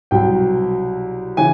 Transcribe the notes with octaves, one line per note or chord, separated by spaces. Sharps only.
C2 B2 F#3 G5
C#3 E3 G#5